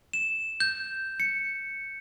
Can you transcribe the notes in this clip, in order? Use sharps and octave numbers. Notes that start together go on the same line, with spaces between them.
E7
G6
C#7